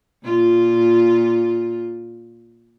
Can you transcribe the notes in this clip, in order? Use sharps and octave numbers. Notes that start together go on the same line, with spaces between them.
A#2 F4